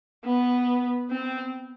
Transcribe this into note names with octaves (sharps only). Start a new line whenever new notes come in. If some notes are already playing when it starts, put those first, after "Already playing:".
B3
C4